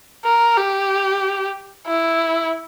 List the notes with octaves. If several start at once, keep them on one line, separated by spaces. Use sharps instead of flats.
A#4
G4
E4